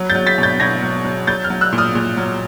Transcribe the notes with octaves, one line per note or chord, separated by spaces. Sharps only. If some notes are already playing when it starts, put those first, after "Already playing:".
Already playing: F#3
G6 A6
F#3
A6 B6
B2
G6 A6
B2 G#6 A#6
F#3
F#3
F#3 G6 A6
F6 G6
F#3
E6 F#6
A#2
D#6 F6
A#2
F#3